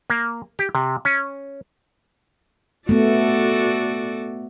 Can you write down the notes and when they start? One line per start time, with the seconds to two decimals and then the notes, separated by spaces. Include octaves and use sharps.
0.10 A#3
0.59 G4
0.75 C3
1.05 C#4
2.89 A3 B3 F#4 A4 D5